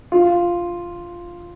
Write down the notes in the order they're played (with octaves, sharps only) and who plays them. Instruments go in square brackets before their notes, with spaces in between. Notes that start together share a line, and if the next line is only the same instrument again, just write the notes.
[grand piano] F4